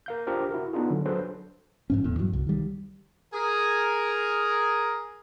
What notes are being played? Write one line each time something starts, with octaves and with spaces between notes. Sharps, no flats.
A#4 F5 G6
D4 F4 G4 A#4 C5
E4 F#4 A#4
B3 D4 D#4 F4 G#4
D3 F#3
F#3 D4 G#4 A4 B4 C5
F2 G#2 C#4
D#1 A1 E2 A2
G2 F#3
C2
D#3 G3
G#4 A#4